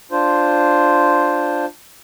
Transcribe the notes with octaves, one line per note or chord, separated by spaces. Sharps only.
D4 F4 C5